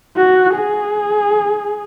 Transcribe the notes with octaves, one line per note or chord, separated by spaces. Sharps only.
F#4
G#4